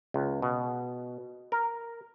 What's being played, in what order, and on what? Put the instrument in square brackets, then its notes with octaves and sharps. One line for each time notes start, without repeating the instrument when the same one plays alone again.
[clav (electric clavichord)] C#2
B2
A#4